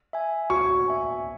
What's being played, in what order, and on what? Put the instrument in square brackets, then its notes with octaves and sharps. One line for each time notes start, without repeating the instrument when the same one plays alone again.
[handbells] E5 G#5
[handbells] F#4 [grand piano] C#6
[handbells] E5 G#5